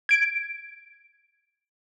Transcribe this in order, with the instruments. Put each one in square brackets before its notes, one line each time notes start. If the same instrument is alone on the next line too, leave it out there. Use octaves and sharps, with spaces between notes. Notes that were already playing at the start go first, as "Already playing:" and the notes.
[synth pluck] G#6 D7